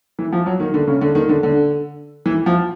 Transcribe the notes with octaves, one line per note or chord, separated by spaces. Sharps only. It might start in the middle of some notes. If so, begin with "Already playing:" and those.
E3
F3
F#3
D#3
D3
C#3
D3
D#3
D3
D3
E3
F3